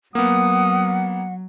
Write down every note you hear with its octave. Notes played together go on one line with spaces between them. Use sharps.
F#3 A#3 B3 F#5 D#6